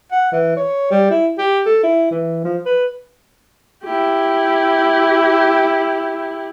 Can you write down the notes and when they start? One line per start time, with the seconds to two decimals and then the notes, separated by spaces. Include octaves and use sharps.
0.12 F#5
0.32 E3
0.56 C#5
0.91 G3
1.10 E4
1.38 G4
1.66 A4
1.83 E4
2.11 E3
2.44 F3
2.66 B4
3.84 E4 G4